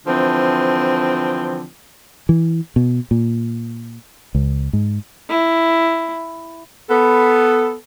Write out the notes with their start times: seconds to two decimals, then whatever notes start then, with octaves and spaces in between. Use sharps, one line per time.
0.07 D3 E3 F3 C4
2.29 E3
2.76 B2
3.11 A#2
4.35 C#2
4.73 G#2
5.29 E4
6.89 B3 A4